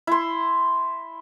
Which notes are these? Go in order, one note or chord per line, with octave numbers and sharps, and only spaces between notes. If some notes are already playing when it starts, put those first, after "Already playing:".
E4 C6